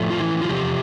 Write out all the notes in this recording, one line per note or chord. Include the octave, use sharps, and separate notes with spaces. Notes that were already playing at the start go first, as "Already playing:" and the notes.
Already playing: A2 F3 A3
F4
E3 E4
F4
E2 C3 F3 G4